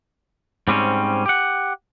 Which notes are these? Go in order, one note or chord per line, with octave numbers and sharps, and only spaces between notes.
G#2 G3 C4 C#4
G4 F#5